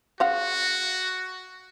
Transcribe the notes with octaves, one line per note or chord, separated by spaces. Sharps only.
C#3 F#4 F5 F#5